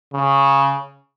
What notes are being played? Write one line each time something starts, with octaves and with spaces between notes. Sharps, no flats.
C#3